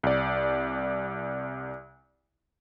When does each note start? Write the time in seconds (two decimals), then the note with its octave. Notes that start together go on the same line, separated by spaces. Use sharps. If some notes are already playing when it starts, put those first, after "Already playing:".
0.03 C2 D5